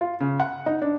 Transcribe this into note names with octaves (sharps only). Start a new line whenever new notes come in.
F4
C#3
F#5
D#4
D4